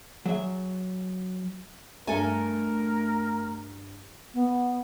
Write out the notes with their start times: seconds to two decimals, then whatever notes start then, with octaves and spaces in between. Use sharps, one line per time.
0.26 F#3 G#4 E5
2.07 G2 A3 A4 A#4 G#5
4.34 B3